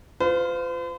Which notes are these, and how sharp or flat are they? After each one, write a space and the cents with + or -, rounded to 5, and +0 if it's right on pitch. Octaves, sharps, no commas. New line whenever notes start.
F4 +0 C5 -45